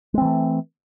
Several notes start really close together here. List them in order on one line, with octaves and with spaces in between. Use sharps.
G#3 C4 E3 A3